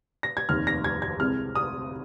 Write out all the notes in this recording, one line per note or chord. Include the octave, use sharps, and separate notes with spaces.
A#6
G#6
F1 D#2 D#3 F6
A#6
G#6
G#6
C2 C3 G#3 F6
D#6